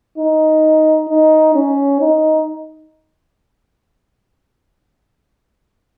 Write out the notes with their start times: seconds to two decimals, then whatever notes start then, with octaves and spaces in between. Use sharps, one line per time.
0.18 D#4
1.09 D#4
1.55 C#4
2.01 D#4